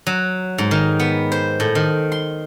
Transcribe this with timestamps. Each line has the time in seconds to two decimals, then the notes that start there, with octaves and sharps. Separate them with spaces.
0.07 F#3
0.58 G#2
0.71 D#3
1.00 B3
1.32 C5
1.60 A2
1.75 D#3
2.12 C6